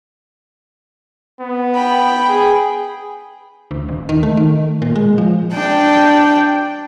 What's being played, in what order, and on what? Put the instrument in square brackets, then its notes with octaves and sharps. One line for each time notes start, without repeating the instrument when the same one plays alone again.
[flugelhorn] B3
[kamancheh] G5 B5
[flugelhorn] G#4
[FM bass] D2
D#1
D#3
A3
D#3
A#2
G#3
F3
[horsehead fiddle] D4 G5